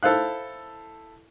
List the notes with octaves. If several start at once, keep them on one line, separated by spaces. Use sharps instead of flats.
E4 A4 C5 F5 F#6